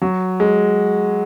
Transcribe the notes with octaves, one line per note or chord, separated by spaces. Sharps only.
F#3
G#3